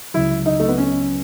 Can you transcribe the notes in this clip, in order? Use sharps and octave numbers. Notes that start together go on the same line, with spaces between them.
C#2 C#3 F#3 E4
D#4
A3
B3
C#4